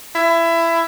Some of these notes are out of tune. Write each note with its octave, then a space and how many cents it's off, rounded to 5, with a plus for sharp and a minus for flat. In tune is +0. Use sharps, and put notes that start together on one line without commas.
E4 +20